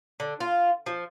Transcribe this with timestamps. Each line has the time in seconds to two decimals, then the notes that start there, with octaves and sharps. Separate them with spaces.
0.20 D3
0.40 F4
0.86 F3